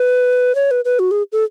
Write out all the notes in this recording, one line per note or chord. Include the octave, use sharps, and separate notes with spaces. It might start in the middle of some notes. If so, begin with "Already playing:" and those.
Already playing: B4
C#5
B4
B4
F#4
G#4
A4